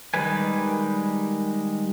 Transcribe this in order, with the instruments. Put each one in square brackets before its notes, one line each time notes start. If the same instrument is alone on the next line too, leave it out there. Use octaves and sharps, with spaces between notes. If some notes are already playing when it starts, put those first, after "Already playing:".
[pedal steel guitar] D#3 G3 G#3 B4 G#5